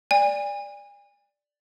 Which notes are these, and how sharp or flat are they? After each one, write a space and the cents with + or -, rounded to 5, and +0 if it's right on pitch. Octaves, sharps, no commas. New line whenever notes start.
D5 +0 G#5 -40